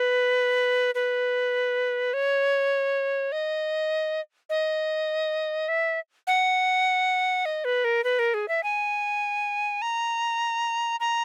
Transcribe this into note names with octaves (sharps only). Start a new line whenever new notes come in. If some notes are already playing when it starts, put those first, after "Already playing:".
Already playing: B4
B4
C#5
D#5
D#5
E5
F#5
D#5
B4
A#4
B4
A#4
G#4
E5
G#5
A#5
A#5